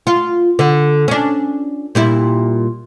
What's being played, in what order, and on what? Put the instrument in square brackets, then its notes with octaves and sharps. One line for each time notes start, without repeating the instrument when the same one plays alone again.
[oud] F4
D3
C#4 D4
A#2 G3 E4